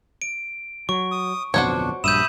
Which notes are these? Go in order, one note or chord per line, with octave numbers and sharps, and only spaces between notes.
D7
F#3 C#6
D#6
D1 F2 B2 D4 F#4 C5 C#5
A#1 G2 E5 B5 D#6 G6 D#7 E7